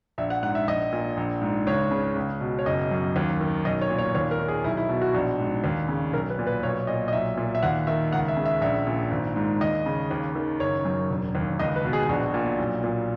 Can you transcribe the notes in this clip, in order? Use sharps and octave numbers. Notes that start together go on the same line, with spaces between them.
A#1 E5
F#5
G#2 F#5
E5
A#1 D#5
A#2
A#1
G#2
C#2 C#5
C#3
C#2
B2
C#5
F#1 D#5
F#2
D#2
D#3
B1 D#5
C#5
A#2
C#5
D#2 C#5
A#4
D#3
G#4
B1 E4
E4
B2
F#4
A#1
G#2
D#2
C#3
B1 A#4
B4
A#2
B4
B1 C#5
A#2 D#5
D#5
B1 E5
A#2
E5
D#2 F#5
D#3 E5
C#2 F#5
E5
C#3
E5
A#1 E5
A#2
G#1
G#2
D#2 D#5
C#3
D#2
D#3
F#1 C#5
F#2
E1
D#2
C#2 D#5
B4
B2
G#4
A#1 F#4
A#2
B1
A#2